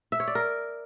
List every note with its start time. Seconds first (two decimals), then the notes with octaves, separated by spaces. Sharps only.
0.12 E5
0.20 C#5
0.28 D5
0.35 A#4